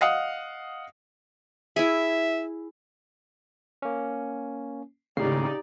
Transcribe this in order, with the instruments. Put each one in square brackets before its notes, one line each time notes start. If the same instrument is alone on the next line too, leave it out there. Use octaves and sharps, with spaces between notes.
[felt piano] D#5 F5 F#5 D#6
[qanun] E4 G#4 [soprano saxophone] E5
[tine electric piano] A#3 C#4
[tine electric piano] G#1 A2 C7 [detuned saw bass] C#3 [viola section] D#4 G4 D5